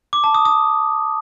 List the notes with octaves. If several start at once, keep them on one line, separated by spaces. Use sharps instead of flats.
D6
A5
D#6
D#6